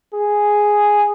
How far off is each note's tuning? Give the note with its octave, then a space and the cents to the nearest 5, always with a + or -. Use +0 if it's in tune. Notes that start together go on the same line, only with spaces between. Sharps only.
G#4 +0